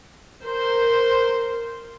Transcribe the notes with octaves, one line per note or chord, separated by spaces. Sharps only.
A#4 C5